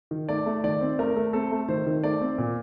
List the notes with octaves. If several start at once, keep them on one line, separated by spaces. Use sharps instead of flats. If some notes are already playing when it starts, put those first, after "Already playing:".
D#3
A3 D5
A3
D#3 D5
C4
A3 A#4
A3
C4 A4
A3
D#3 C5
D#3
A3 D5
C4
A#2